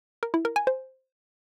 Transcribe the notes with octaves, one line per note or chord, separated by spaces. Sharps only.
A#4
E4
A#4
G#5
C5